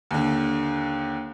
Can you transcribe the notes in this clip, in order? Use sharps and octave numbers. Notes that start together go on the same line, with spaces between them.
D#2 D3